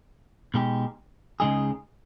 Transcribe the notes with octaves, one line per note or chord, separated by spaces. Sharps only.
B2 G#3 D#4 G4
C#2 C#3 G#3 D#4 G#4